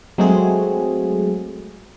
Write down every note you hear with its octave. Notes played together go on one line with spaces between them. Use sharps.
F#3 G#3 A3 C4 F#4 G#4